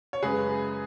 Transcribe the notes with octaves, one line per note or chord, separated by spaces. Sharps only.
C#5
F#2 C#3 G#3 G#4 B4